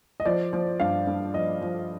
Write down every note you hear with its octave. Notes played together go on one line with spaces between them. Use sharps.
D#5
F3 D5
F3
G2 F5
G2
F3 D#5
F3